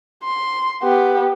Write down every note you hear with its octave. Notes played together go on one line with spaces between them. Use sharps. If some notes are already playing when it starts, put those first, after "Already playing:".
C6
B3 G4